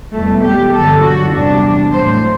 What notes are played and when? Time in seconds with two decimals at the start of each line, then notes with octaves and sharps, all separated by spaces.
0.13 E2 B2 G3 A3
0.44 G4
0.73 G2 D3 F#3 A4
1.03 F#4
1.32 E2 C3 G3 D4
1.92 A2 F#3 C5